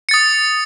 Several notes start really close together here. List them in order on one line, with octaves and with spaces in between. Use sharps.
C#7 A6 D#6